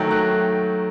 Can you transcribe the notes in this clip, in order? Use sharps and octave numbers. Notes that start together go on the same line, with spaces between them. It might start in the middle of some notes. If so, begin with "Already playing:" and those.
Already playing: D#3 F#3 A3 G5
F#6